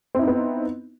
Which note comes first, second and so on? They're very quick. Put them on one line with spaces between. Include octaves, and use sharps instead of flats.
C4 E4 D#4 B3